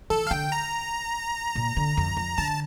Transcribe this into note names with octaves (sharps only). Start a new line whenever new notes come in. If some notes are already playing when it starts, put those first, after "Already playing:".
E3 A4
F5
D3 G5
A#5
A#2
D3
F2
F2
D3 A5